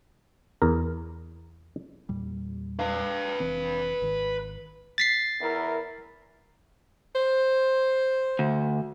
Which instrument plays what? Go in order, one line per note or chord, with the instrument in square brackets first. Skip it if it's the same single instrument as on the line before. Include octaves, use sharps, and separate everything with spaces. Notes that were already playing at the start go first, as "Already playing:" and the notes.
[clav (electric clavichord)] E2 A#4
[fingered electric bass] E2 A#2 G3
[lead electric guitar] B4 F5
[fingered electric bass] F1 E3 C4
G#1 D#3
[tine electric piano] A6 B6 C7
[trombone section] E2 E4 A#4
[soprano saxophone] C5
[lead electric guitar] D2